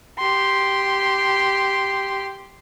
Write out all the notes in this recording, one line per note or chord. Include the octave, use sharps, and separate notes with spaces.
G4 C6